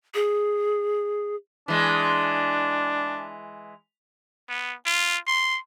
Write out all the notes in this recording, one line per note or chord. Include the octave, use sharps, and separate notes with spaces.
G#4
E3 G#3 D4
B3
F4
C6